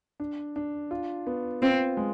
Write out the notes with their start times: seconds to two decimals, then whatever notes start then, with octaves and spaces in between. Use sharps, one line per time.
0.20 D4
0.56 D4
0.91 F4
1.27 B3
1.62 C4 F4
1.97 G#3